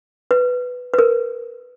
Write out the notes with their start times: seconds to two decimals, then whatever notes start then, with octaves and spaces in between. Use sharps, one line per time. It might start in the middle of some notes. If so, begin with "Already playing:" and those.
0.31 B4
0.94 B4
0.98 A#4